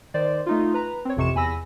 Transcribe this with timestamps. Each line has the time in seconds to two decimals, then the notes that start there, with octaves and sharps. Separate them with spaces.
0.14 D#3 C5 D5
0.46 A3 D#4 F4
0.74 B4 A#5
1.05 C4 C#5
1.17 A1 F2 C3 C#6 C#7 E7
1.35 E2 G#5 B5 E6 A#6